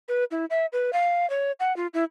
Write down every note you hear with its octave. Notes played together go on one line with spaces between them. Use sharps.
B4
E4
E5
B4
F5
C#5
F#5
F4
E4